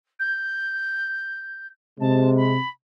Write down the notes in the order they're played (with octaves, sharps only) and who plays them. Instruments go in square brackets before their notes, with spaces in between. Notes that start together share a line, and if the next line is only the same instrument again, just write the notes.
[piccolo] G6
[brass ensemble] C3 G#3 [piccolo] A5
[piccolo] B5